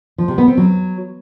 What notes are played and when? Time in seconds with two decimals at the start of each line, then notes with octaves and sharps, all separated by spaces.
0.18 F3
0.28 C3
0.38 B3
0.48 C4
0.57 F#3